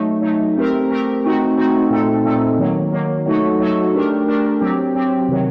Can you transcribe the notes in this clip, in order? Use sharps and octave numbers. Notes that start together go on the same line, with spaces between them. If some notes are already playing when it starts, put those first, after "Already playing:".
Already playing: F#3 A3 D#4
F#3 A3 D#4
A3 C4 G4 A#4
A3 C4 G4 A#4
A3 C4 D#4 F#4
A3 C4 D#4 F#4
A#2 A3 C4 D#4 A4
A#2 A3 C4 D#4 A4
D#3 F#3 A#3
D#3 F#3 A#3
F#3 A3 D#4 F#4 A4
F#3 A3 D#4 F#4 A4
A3 D4 G4 A#4
A3 D4 G4 A#4
F#3 C4 G4
F#3 C4 G4
C3 D#3 F#3